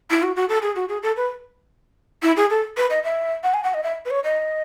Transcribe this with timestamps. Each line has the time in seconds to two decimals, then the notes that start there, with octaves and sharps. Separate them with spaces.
0.11 E4
0.23 F#4
0.36 F#4
0.49 A4
0.62 G#4
0.76 F#4
0.89 G#4
1.03 A4
1.17 B4
2.23 E4
2.37 G#4
2.50 A4
2.77 B4
2.90 D#5
3.04 E5
3.43 F#5
3.54 G#5
3.64 F#5
3.74 D#5
3.83 E5
4.05 B4
4.11 C#5
4.24 D#5